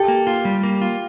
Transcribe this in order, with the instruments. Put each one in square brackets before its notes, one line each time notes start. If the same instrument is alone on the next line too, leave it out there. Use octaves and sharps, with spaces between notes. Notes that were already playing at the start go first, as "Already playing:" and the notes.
Already playing: [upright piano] G4 [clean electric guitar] A4
[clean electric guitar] A#3
F4
G3
A#3
F4